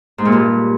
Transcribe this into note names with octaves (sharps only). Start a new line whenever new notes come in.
G#2
A#2
G2